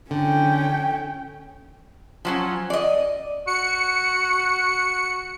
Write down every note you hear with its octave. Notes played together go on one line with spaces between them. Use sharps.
D3 C#4 G5
F3 F#3 C#4
D5 D#5
F#4 C#7